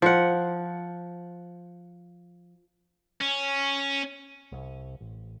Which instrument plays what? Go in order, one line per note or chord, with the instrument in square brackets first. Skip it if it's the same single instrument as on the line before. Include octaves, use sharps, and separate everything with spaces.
[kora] F3 F#5
[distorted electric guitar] C#4
[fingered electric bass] C2
A1